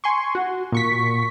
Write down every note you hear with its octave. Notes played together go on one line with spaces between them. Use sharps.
G#5 C6 C#6
F#4
A#2 C#6 B6